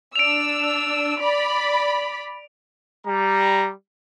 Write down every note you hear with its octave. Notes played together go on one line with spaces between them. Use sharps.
D4 E6 D7 F7
D5 B5
G3 A#5